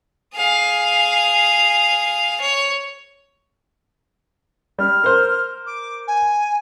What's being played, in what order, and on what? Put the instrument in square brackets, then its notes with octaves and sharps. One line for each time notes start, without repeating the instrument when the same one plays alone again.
[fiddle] G#4 F5
C#5
[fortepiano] G3 [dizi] F6
[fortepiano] A#4 C5
[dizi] D6
G#5